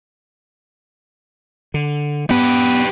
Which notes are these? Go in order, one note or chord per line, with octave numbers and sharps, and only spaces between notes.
D3
B3 G4 B4